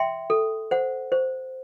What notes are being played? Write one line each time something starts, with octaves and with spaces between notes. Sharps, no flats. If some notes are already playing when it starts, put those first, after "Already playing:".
Already playing: E5 G5 C6
A4
C5 F#5
C5